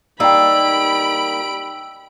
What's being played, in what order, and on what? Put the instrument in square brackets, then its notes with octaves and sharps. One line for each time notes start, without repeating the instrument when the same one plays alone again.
[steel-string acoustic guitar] G3 A#3 D#4 [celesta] G5 E6 [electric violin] B5 D7